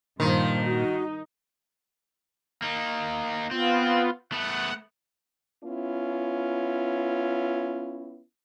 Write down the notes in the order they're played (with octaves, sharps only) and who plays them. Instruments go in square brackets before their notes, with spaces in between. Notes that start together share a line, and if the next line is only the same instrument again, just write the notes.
[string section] G2 F3 [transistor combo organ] A#2 [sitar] D#3 [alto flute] C6
[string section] D#4 [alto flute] F#4
[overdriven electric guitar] A#3 D#4
[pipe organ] B3 F4 [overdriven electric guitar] C4
[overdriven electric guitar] A3 B3 [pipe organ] F#5
[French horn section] B3 C#4 E4 F4